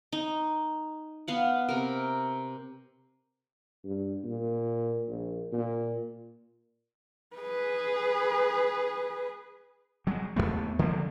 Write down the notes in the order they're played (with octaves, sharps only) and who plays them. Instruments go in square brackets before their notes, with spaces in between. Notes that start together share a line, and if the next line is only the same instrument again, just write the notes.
[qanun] D#4
B3 F5 F#5
C3 A#4
[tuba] G2
A#2
A#1
A#2
[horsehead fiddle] G#4 B4
[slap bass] F#3 G#3
D#2 A2 A3 B3
D3 F3 G#3 A#3